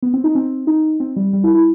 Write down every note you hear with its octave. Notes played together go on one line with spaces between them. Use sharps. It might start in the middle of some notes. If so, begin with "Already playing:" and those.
B3
C4
D#4
C4
D#4
C4
G3
G3
E4
E4